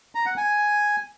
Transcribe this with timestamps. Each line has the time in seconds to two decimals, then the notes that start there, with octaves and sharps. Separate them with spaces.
0.15 A#5
0.26 F#5
0.37 G#5